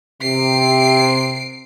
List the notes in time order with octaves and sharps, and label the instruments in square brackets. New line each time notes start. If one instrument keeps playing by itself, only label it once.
[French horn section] C3 [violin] C7 D7